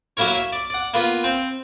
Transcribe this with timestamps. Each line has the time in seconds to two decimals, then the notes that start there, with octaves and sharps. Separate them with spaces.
0.17 F#3 A#3 E4 A#4 C#5
0.32 E5
0.53 D5
0.70 D5 F#5
0.94 A#3 B3 F4
1.24 C4